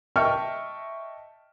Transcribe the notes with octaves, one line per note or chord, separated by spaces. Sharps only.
D#5 E5 G5 A5 C#6 F6